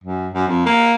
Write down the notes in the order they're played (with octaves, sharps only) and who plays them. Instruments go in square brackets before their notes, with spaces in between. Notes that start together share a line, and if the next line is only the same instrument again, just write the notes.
[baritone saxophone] F#2
F#2
F2
A#3